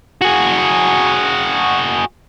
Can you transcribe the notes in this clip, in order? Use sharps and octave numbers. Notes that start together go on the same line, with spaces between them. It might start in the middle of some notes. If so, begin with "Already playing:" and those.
F#4 G#4